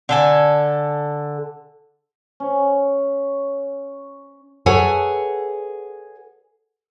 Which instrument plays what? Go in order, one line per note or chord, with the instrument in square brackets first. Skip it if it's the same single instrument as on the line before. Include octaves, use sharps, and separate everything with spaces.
[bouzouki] D3 A4 G#5
[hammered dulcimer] C#4 C#5
[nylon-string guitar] G#4 A4 B4 C#5 F#5 G#5